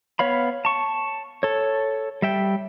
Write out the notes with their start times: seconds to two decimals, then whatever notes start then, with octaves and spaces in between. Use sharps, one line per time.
0.19 B3 C#5 F5 B5
0.65 A5 C#6
1.43 A4 C#5
2.22 G3 E5 G5